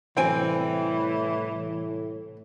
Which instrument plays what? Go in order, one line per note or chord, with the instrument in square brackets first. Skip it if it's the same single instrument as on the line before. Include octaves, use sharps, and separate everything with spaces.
[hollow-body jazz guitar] C2 G5 G#5 [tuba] A2 [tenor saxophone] E3 [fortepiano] C4